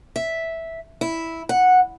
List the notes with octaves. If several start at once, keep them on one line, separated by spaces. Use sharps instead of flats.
E5
E4
F#5